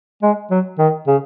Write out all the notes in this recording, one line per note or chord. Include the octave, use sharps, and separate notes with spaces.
G#3
F#3
D#3
C#3